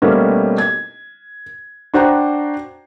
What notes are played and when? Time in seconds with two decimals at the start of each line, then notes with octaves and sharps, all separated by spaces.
0.02 B2 G3 A3 A#3 C4 C#4
0.58 G#6
1.94 D4 F#4 C5 G5 A#5